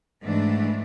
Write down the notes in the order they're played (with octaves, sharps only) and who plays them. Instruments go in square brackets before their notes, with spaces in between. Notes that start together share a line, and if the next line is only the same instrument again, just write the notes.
[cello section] G#2 E3 A3 D4